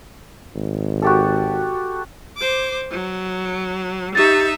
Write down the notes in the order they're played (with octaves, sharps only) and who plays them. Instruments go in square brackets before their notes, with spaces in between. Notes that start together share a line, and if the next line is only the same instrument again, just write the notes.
[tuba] G#1
[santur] F#4 G4 A4
[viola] C5 D6
F#3
[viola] D#4 E5 [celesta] G4 A6